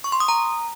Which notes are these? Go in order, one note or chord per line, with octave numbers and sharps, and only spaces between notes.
C#6
C6
D#6
A#5